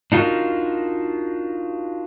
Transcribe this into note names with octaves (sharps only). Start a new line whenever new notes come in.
D4 D#4 F4 F#4 A#4